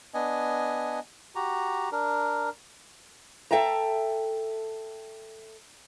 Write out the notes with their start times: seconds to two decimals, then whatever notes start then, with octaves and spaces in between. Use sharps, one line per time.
0.14 B3 D4 D#5 G#5
1.35 F#4 G4 A#5
1.92 D4 A#4
3.51 A4 E5 G5 A5 A#5